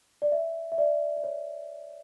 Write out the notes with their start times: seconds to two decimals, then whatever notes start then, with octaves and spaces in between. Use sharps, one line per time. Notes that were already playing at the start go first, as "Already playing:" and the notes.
0.22 D5
0.32 E5
0.72 E5
0.78 D5
1.17 D5
1.24 C#5